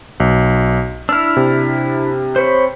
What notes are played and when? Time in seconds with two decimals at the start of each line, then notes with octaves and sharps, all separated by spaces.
0.20 B1
1.09 D4 E4 E6 F6
1.37 C3
2.36 C5 C#5 B5